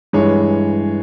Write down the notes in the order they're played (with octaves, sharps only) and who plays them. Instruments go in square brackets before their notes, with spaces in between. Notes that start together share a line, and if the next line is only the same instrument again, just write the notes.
[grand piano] G2 E3 G#3 C#5